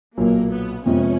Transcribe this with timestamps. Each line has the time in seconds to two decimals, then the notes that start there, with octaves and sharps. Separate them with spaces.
0.18 B1 A#2 F#3 A#3
0.52 B3
0.86 F2 C3 F3 G#3 B3 C#4